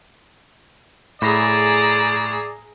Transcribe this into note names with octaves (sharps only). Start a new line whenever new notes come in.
A2 G#4 D5 A#5 B5 E6 A#6